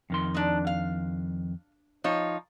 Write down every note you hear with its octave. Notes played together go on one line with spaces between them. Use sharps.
F2 D#3 C6
D4 D#4
F5
F3 D#4 C#5